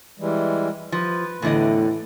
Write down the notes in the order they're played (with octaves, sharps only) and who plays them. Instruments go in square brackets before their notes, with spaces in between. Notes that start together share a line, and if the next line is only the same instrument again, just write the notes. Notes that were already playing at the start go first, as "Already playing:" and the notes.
[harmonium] E3 G3 G#3
[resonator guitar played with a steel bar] F3 [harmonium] B4
[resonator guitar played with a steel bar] E2 D3 D#5 [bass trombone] A2